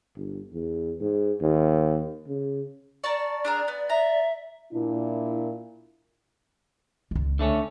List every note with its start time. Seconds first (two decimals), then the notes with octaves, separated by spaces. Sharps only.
0.16 G1
0.53 E2
1.01 G#2
1.42 D#2
2.28 C#3
3.04 A#4 D5 A5 C#6
3.45 D4 G#4 A#4
3.68 B3
3.90 E5 A#5
4.72 A#2 D4 E4
7.11 C#2 G#3
7.39 D3 A3 C#4